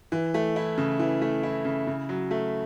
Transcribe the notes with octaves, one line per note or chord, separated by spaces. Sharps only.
E3
A3
E4
C#3
E3
A3
E4
C#3
C#3
F#3
A3